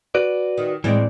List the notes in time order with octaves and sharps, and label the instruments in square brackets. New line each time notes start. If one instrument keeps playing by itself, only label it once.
[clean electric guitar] F#4 B4 D5
[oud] D#3
[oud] A2 G#3 [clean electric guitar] E3 C4 D5